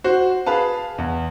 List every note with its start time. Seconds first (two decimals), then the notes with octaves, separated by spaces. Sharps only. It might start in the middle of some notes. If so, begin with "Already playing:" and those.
0.04 F#4 C5
0.46 G#4 B4 F5 A5
0.98 E2